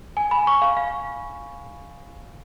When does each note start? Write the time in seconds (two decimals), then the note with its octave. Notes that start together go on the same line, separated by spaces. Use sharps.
0.17 G#5
0.31 B5
0.47 C#6
0.62 F5
0.77 F5